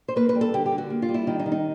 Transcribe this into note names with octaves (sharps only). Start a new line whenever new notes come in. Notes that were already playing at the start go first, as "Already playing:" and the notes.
C5
A#3 B4
B4
G3
A4
D3 G4
G4
D3
F#4
A#3
F4
G3
E4
D#3 D#4
D#4
D#3
D#4